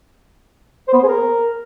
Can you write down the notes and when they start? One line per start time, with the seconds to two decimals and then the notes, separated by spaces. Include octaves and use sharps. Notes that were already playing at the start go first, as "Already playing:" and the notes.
0.88 C5
0.93 B3
0.98 C5
1.03 G#4
1.08 A#4